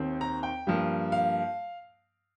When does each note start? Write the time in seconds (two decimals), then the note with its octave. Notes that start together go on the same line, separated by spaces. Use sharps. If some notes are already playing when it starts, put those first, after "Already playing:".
Already playing: D#2 D#3 C4
0.21 A#5
0.43 G5
0.67 G2 F3 A#3
1.12 F5